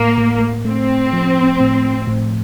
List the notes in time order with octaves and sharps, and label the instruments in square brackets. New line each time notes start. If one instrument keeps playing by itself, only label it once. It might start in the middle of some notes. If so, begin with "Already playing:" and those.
Already playing: [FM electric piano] A2 [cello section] A#3
[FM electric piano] A2
[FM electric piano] A3 [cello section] C4
[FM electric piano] F3
A2
A2